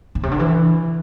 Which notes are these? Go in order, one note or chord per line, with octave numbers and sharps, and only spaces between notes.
A#2
C3
D3
E3